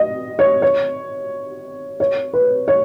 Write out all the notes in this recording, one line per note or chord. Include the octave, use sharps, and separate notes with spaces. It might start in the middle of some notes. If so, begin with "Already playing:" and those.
Already playing: D#5
C#5
C#5
C#5
B4
C#5